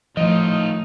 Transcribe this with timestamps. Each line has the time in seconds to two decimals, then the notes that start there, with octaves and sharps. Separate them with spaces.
0.17 A2 D#3 F3 D#4 F4 D#5